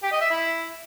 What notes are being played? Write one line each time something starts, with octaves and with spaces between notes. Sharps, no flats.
G4
D#5
E5
E4